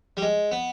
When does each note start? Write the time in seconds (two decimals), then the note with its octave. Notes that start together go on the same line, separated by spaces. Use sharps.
0.17 G3
0.22 G#3
0.52 B3